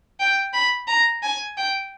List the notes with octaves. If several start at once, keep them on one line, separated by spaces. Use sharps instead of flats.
G5
B5
A#5
G#5
G5